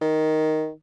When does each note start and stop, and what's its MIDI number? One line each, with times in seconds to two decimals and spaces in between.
0.02 0.70 51